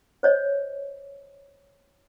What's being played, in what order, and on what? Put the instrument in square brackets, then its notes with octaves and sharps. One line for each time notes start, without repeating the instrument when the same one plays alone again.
[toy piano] C5 C#5 D#5